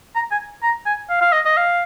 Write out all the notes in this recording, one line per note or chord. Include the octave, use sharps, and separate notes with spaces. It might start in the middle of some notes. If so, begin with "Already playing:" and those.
A#5
G#5
A#5
G#5
F5
F5
D#5
D#5
F5